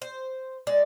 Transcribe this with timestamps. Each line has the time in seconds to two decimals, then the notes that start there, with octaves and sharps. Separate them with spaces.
0.02 C5
0.67 G#3 D5